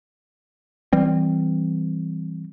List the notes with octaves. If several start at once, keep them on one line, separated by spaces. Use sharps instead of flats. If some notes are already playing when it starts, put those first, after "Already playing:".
E3 G3 C4